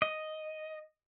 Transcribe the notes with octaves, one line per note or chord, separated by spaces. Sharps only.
D#5